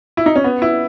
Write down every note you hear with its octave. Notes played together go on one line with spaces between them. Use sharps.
E4
D#4
C#4
B3
E4